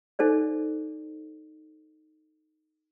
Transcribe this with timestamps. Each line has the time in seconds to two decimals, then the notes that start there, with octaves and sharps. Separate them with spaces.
0.19 D#4 A4 C5 D5